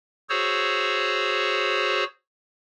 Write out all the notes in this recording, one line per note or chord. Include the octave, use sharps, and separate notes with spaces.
F#4 G#4 C5 C#5 E6